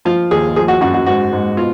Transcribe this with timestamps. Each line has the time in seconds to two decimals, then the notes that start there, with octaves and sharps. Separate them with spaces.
0.05 F3 F4
0.31 D#2 G#4
0.56 F3 G#4
0.68 F#4
0.81 F#2 F#4
0.94 F#4
1.06 G#2 F#4
1.32 G#2
1.57 B2 F4